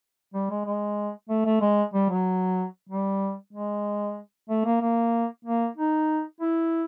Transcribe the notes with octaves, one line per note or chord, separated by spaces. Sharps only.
G3
G#3
G#3
A3
A3
G#3
G3
F#3
G3
G#3
A3
A#3
A#3
A#3
D#4
E4